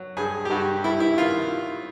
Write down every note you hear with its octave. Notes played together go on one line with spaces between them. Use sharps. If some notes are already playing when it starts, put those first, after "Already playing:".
Already playing: F#3
G2 G#4
G4
G2 F#4
G3 E4
E4
D#3 F4